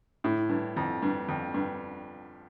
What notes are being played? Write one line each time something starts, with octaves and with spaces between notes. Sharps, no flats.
A2
G2
F2
G2
F2
G2